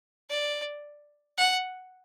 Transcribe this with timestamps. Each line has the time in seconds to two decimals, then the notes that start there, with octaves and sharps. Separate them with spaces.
0.30 D5
1.38 F#5